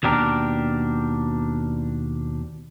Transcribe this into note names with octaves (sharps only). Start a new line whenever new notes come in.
D#2 B2 D4 G4 A#4